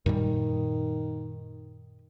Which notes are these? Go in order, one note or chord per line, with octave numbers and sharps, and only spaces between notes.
F#2 A#2 D#3 G3